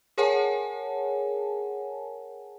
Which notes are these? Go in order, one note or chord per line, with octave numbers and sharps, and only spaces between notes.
G#4 A#4 C#5 F#5 G#5 A5